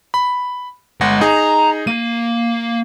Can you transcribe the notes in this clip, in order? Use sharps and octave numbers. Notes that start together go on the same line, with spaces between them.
B5
G1 G#3 F#5 A#6
D#4 G#4 A#5
A#3 D#7